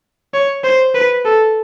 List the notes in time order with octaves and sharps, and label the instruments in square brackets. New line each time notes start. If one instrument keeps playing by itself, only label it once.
[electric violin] C#5
C5
B4
A4